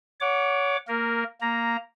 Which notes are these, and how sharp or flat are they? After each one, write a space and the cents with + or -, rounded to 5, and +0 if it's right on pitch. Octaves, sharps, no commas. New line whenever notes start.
C#5 +25 F#5 -15 D6 +0
A#3 -15 A#4 +0
A#3 -5 A#5 +0